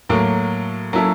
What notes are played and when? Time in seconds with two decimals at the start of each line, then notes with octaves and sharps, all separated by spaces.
0.09 A2 F#3 A#3
0.93 F#3 A#3 C#4 E4 A4